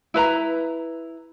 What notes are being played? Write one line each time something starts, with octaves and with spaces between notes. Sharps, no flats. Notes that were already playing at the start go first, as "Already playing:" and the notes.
E4 B4 A#5